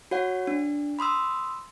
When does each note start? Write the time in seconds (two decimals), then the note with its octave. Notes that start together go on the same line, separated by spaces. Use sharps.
0.11 F#4 C#5 F#5
0.47 D4
0.99 B5 C6 D#6 E6